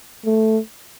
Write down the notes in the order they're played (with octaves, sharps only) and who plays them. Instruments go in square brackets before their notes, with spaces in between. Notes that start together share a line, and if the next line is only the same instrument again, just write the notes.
[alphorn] A3